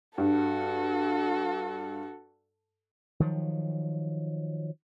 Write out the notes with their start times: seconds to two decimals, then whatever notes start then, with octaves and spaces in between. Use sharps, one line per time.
0.18 G2 F#4 A4
3.20 D#3 F3 F#3